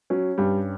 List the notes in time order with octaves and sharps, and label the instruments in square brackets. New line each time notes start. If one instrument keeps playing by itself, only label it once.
[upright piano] F#3 [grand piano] C#4
[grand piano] G2 [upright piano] G3